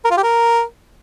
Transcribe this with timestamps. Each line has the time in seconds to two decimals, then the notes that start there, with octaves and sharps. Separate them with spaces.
0.05 A#4
0.11 F4
0.17 G4
0.23 A#4